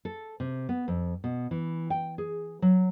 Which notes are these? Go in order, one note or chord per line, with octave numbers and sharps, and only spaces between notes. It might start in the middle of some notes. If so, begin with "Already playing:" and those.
A4
C3
B3
F2
B2
E3
G5
G#4
F#3